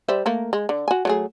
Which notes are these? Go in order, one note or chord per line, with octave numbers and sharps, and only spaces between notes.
G3 C5 E5
A3 A#3 A#4
G#3
D3
F#4 G#5
F#3 A3 G#4